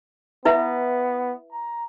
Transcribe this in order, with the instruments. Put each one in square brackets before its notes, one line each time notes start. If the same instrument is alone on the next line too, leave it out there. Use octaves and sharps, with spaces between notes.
[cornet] B3 [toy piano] E4 B4 E5
[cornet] A#5